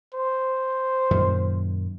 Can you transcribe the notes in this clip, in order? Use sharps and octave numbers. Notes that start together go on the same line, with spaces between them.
C5
F#2 A#2 D#3